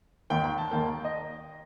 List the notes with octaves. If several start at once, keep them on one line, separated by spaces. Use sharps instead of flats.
D#2 D#3 A#3 G5
G5
A5
D#2 D#3 A#3 G5
D#5